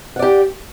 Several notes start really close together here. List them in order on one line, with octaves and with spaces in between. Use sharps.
F#5 D5 G4